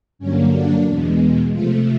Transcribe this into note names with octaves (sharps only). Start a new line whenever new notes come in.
G2 D3 F#3 A#3 C#4
D4
E2 B2 G#3
C3 F3 A3 F4